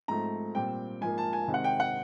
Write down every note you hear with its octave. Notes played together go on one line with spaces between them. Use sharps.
G#2 F3 A3 C4 A#5
A#2 G3 C4 G5
G#2 F3 A#3 G#5
A5
G#5
C3 D#3 G#3 C4
F#5
G5
F#5